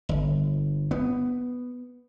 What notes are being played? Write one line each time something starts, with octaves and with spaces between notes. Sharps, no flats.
G1
B3